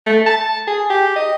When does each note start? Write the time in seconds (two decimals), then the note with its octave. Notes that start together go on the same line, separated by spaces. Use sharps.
0.07 A3
0.26 A5
0.67 G#4
0.90 G4
1.16 D#5